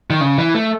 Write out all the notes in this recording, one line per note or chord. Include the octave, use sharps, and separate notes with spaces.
D#3
C#3
E3
A3